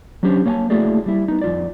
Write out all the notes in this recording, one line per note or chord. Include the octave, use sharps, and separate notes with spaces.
F#3 C#4 D4 G4 C5
A#3 C#5 D5 F#5 G#5 A5
A3 A#3 E4 F#4 G#4 D5
G3 E4
B3 D#4
F2 F4 D5